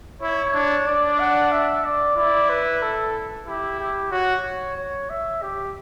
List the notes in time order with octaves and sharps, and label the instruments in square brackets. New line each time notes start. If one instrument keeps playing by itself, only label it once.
[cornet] E4 [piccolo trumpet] C#5
[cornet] D4
[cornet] D4 [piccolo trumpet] D5
[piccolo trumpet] F#5
E5
D5
[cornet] E4 [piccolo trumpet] D5
[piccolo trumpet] B4
A4
[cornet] E4 [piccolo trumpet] G4
[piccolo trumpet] G4
[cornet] F#4 [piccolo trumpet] C#5
[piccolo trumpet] C#5
E5
G4